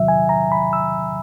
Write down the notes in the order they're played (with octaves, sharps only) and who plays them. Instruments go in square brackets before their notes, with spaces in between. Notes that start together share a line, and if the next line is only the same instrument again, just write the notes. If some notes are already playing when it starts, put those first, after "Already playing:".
Already playing: [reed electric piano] E2 C3 D#3 F#3 E5
G#5
A#5
B5
E6